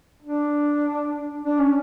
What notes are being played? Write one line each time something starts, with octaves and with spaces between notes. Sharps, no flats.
D4
D4
C#4